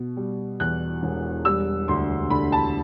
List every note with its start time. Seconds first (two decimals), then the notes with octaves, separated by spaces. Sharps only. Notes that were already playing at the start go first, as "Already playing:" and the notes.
Already playing: B2
0.17 G3
0.60 E2 F#6
1.03 E1
1.45 G3 E6
1.88 D2 C6
2.30 D3 B5
2.52 A5